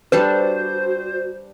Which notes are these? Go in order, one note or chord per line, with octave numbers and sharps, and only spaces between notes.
G3 D4 F#4 A4 B4 C5